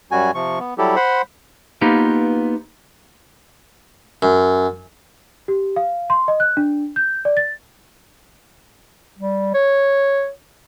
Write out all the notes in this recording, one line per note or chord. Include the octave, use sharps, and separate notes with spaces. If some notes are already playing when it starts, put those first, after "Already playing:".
F#2 G3 F#4 G#5
C3 F3 C#6
B3
F#3 G3 E4 G4 A4
C5 F#5 B5 C6
A#3 B3 D#4 F4 G4 B4
F#2
G4
F5
C6
D#5
F#6
D4
G6
D5
A6
G3
C#5